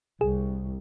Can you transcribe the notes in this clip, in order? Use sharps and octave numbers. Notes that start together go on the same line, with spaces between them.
C2 G#4